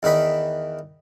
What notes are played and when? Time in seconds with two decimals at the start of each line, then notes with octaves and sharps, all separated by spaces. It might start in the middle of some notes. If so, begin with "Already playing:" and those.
0.03 E2 D#3 D#4 B4 B5